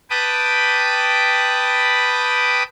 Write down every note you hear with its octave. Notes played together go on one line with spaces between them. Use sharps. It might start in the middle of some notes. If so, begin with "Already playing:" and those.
B4 G5 A5 B5 D6 D#6